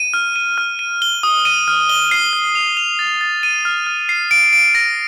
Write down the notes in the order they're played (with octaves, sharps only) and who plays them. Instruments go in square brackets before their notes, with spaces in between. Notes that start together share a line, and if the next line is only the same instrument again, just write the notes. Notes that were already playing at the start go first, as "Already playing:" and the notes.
Already playing: [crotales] D#7
F6
D#7
F6
D#7
G7
D#6
D#7
F6
G7
C7
F6
F7
F7
A6
A6
D#7
F6
F6
C7
D7
D7
A#6